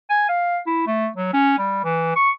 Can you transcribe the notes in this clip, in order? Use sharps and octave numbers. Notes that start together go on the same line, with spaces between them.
G#5
F5
E4
A3
F#3
C#4
G3
E3
C#6